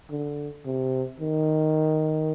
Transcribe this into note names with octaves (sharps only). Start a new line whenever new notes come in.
D3
C3
D#3